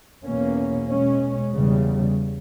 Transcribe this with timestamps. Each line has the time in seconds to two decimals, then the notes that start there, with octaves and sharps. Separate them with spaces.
0.25 E2 B2 A#3 C#4
0.89 B2 G#3 C#4
1.52 E2 C#3 G3